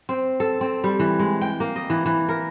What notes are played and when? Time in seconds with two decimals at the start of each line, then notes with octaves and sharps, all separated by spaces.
0.09 C4
0.40 A4
0.61 C4
0.84 G3
0.99 E3
1.19 G#3
1.41 G5
1.60 A#3
1.76 D#5
1.90 E3
2.06 E3
2.29 A#4